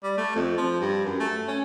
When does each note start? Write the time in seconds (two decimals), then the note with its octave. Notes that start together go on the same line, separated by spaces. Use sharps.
0.03 G3
0.17 A3
0.35 F2
0.57 F3
0.80 G2
1.05 F#2
1.20 A3
1.48 C#4